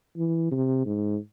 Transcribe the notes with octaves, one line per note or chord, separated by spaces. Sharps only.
E3
C3
G#2